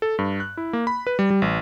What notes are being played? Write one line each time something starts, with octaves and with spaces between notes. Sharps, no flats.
A4
G2
F#6
E4
A#3
B5
B4
G3
G3
A1